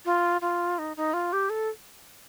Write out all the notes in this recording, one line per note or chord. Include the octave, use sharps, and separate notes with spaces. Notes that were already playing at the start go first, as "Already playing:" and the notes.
F4
F4
D#4
D#4
F4
G4
A4